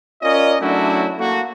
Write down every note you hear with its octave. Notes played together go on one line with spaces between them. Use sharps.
C#4 F4 A#4 D5 D#5
F#3 A3 C#4 D4 E4 F#4
A3 A#3 F#4